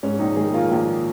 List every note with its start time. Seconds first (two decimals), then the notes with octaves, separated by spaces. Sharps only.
0.03 G#2 C#4
0.19 A#1 D#4
0.36 D#3 G#4
0.53 A#3 F4
0.71 A#1